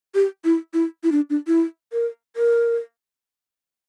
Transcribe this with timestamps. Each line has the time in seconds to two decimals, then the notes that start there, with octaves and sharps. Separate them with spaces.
0.15 G4
0.45 E4
0.74 E4
1.03 E4
1.12 D4
1.30 D4
1.47 E4
1.92 A#4
2.36 A#4